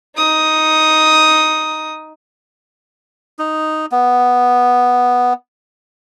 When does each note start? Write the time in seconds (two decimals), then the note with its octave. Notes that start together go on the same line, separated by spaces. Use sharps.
0.17 D#4 D#6
3.39 D#4
3.92 B3